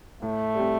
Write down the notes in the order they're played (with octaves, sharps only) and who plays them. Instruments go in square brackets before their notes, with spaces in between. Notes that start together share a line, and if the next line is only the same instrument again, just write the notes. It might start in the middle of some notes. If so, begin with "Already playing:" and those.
[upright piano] A2 [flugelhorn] A3
[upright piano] G3 C4 G4